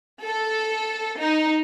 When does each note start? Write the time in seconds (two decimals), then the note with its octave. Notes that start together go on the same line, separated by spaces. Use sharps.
0.23 A4
1.18 D#4